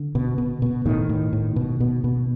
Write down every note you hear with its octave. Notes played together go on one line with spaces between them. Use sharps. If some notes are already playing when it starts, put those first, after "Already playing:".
Already playing: D3
B2
B2
B2
A2 D#3
A2
A2
B2
B2
B2